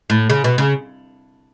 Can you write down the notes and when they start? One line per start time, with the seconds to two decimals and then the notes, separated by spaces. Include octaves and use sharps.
0.10 A2
0.30 C#3
0.44 B2
0.58 C#3